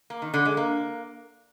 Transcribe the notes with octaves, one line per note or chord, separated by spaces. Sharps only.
A#3
D#3
D3
G#3
A#3